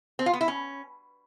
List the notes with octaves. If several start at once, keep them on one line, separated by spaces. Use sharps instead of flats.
C4
F4
B3
E4
C#4